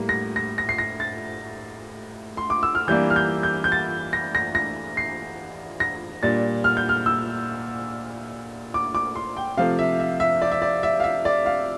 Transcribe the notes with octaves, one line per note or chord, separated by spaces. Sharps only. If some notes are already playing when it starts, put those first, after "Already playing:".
Already playing: A2 G3 A#3
A#6
A#6
A#6
C7
A#6
A6
C6
D6
E6
F6
E3 G3 A#3 D4 G6
F6
G6
G6
G6
A6
A#6
A#6
A#6
C7
A#6
A#2 G3 D4 A6
F6
G6
F6
E6
D6
D6
C6
G5
C3 F3 A3 F5
E5
E5
E5
D5
E5
D5
E5
F5
E5
D5
F5